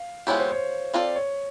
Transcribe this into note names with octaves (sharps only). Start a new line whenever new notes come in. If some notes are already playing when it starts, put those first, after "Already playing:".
Already playing: F5
F3 G#3 B3 E4 G4 C#5
C5
C#5
C4 F4 A4 D5
C#5